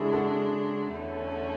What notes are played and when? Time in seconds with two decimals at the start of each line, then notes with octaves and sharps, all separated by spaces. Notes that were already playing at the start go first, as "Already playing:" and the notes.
Already playing: C#3 G#3 D4 E4 F#4 G#4 A4
0.13 F#4 A4
0.94 E2 D3 A3 C#4